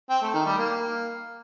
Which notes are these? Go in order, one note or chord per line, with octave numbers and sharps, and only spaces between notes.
C4
A3
D#3
G3
A#3